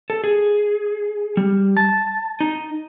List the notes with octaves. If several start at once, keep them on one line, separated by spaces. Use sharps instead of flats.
A4
G#4
G3
A5
D#4